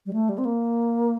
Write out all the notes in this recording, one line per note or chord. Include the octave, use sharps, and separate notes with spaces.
G3
A3
G3
C4
A#3